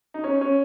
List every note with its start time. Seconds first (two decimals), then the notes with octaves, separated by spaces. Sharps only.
0.14 D#4
0.24 C#4
0.41 C#4